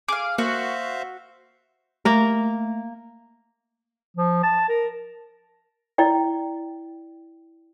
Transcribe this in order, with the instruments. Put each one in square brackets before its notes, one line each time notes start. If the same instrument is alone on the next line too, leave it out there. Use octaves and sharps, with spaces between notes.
[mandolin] G#4 F5 [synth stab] D6
[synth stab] A#3 [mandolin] F#4 [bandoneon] C5 E5 F5
[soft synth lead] A3 [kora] A#3 A#4
[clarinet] F3
A5
A#4
[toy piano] E4 D5 G5